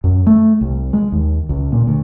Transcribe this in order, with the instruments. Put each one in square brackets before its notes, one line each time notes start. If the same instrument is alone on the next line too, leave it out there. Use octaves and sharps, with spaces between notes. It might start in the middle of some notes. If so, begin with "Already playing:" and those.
[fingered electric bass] F#2
A3
C2
G#3
D#2
C#2
A#2
D2